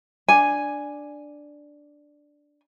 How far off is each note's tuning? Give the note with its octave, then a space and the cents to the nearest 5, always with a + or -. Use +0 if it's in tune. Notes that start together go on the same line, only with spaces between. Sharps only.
D4 +0 G#5 +0